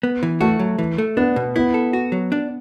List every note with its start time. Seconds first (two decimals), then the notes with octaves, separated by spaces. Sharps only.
0.03 B3
0.23 E3
0.41 A3 F#4
0.59 F#3
0.78 E3
0.98 A3
1.17 B3 D4
1.36 B2
1.56 B3 E4
1.74 A4
1.93 F#4
2.12 F#3
2.32 D4